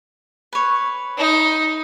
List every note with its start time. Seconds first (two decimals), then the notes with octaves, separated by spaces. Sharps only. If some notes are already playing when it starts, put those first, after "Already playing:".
0.53 B4 C#5
1.18 D#4